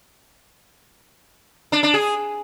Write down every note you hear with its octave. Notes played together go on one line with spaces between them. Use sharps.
D4
D4
G#4